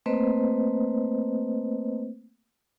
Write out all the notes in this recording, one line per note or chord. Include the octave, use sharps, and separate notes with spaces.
A3 A#3 C4 B4 C5 D#5